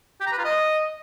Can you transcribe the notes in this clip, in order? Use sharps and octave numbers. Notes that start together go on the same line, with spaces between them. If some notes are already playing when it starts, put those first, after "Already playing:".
G4
A#5
B4
F4
D#5